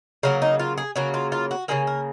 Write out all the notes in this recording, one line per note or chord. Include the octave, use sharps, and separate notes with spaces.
C#3 F#3 A#3 A#4
D#4
F4
G#4
C#3 F#3 A#3 F#4
F4
F4
F#4
C#3 F#3 A#3 G#4
A#4